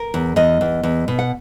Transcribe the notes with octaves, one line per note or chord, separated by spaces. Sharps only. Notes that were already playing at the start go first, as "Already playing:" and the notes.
Already playing: A#4
E2
E2 D#5
E2
E2
B2
F#5